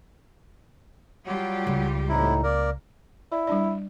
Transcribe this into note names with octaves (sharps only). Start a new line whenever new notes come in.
F#3 G3 F4 G4
C#2
A2 C3 D#4 E4
A#3 A#4 D5
E4 D5
G3 D4 D5